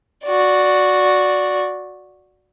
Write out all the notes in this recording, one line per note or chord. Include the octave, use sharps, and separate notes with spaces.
F#4 D5